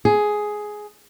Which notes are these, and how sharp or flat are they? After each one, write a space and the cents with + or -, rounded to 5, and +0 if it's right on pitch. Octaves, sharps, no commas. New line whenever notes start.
G#4 +10